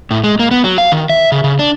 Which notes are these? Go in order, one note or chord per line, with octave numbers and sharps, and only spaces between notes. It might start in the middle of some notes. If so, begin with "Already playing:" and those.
A2
G#3
A#3
B3
F#3
F5
D#3
E5
C#3
C#3
D4